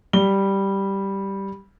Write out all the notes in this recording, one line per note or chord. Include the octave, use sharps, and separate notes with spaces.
G3 G7